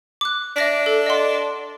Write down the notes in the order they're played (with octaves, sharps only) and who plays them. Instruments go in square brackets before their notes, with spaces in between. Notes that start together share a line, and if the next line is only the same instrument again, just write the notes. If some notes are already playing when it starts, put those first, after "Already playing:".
[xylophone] D6 F#6
[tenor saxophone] D4 [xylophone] E5 A#6 B6
[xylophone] A4
D#5 F#5 C6